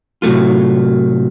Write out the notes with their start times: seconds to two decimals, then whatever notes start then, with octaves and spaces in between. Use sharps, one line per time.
0.22 A2 C3 F#3 A3 F4